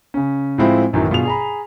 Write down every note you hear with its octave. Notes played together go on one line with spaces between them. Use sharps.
C#3 C#4
A2 F3 G#3 C4 E4 F4
A1 F#2 A2 D#3 F#3
G2 B2 F4 G#4 F7
G#4 A#5 B5